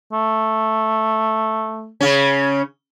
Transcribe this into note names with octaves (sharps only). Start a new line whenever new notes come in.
A3
C#3 C#4